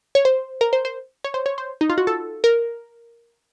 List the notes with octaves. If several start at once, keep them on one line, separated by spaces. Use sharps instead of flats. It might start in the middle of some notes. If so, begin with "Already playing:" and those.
C#5
C5
A#4
C5
C5
C#5
C5
C#5
C5
D#4
F4
F#4
A4
A#4